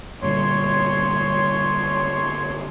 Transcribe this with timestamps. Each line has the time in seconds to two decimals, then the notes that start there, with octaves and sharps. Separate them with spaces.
0.22 G2 A#2 D3 C#5 C6